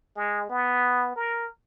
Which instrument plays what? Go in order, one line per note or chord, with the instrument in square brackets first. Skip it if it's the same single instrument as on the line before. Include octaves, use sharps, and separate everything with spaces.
[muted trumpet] G#3
B3
A#4